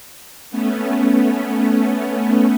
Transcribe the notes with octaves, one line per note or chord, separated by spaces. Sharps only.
A3 B3 C#4